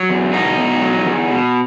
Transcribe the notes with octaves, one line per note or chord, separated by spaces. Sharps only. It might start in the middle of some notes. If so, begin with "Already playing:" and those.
Already playing: F#3
E2
B2 D#4
E2
F#3
E2
B2